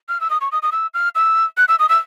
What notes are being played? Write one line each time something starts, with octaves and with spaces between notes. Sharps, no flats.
F6
E6
D#6
C#6
D#6
D#6
E6
F6
E6
F#6
E6
D#6
E6